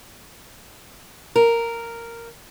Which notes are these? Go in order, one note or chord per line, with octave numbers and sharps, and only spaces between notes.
A#4